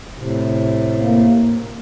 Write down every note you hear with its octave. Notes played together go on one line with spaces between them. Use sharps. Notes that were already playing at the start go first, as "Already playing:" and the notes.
A2 C3
A#3